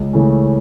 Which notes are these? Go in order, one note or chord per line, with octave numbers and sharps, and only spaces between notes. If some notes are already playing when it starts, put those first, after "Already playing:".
Already playing: C#2
C#3 E3 A3 C#4